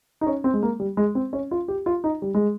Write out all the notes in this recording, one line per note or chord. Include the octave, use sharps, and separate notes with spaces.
D#4
C#4
C4
G#3
A#3
G3
G#3
C4
C#4
F4
G4
F4
D#4
G3
G#3